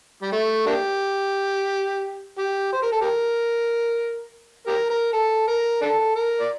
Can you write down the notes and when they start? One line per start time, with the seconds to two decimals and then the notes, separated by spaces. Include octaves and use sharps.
0.22 G3
0.32 A3
0.67 A#3 D4 G4
2.38 G4
2.73 C5
2.82 A#4
2.92 A4
3.01 G4 A#4
4.67 G4 A#4
4.90 A#4
5.13 A4
5.47 A#4
5.82 D4 A4
6.16 A#4
6.40 D5